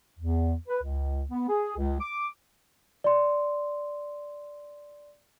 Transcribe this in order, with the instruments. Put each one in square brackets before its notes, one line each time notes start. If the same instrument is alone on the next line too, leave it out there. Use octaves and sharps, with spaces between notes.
[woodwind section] E2
B4
C#2
B3
G#4
C#2
D6
[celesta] D5 C6